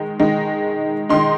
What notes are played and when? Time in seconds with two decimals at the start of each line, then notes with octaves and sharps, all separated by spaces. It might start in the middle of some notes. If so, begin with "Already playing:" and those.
Already playing: D#3 G#3 D#4
0.20 D#3 G#3 D#4
1.09 D#3 G#3 D#4 C6